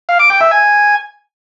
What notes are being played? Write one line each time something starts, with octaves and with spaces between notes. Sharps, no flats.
F5
D6
G5
E5
G#5